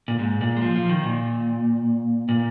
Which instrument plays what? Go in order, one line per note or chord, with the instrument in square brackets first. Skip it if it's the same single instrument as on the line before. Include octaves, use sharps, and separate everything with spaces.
[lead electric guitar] A#2
G#2
A#2
G#3
F3
F3
D#3
A#2
A#2